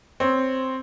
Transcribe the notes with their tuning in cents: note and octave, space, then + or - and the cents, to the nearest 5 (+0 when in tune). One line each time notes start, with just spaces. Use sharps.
C4 +0 C#5 +0